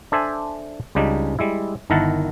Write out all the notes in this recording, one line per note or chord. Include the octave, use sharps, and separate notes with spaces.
D4 A4 C5 E5 G#5
C#2 C#3 G3 D4 D#4
G3 G#3 E4
G1 D#3 E4 A#4 F#5 A5